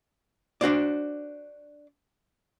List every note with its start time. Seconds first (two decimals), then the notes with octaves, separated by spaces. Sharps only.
0.61 D4 F#4 C5 D5